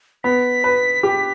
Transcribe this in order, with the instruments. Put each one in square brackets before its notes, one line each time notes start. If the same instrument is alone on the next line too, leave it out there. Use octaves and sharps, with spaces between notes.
[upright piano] B3 [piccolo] B6
[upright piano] B4
G4